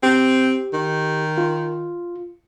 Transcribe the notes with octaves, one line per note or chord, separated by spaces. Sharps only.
C4 G4
D#3
F4